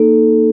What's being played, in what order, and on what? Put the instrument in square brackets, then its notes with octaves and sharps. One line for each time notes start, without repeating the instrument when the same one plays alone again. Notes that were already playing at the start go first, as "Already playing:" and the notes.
Already playing: [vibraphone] A#3 D#4 A4